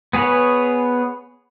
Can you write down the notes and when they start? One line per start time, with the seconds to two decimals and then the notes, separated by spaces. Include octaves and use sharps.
0.13 B3 G#4 B4 C#5 B5